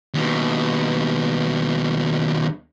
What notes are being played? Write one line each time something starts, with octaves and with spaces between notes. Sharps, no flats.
D#2 B2